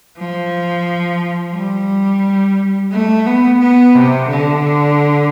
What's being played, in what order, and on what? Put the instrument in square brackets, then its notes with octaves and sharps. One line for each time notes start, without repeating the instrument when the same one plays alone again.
[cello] F3
G3
A3
B3
B3
C3
D3